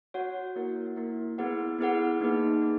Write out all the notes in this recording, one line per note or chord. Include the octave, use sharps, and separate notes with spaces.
F#4 C#5 F#5
A#3 E4 A#4
A#3 E4 A#4
B3 E4 G#4 B4 F#5
B3 E4 G#4 B4 F#5
A#3 D#4 G#4 B4
A#3 D#4 G#4